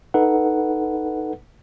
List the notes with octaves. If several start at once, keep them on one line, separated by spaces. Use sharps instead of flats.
D#4 A4 B4 F#5